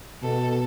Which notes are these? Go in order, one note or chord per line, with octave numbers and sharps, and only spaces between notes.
B2 A4